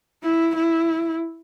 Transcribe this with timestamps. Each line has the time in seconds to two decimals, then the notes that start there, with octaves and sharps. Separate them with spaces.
0.23 E4
0.55 E4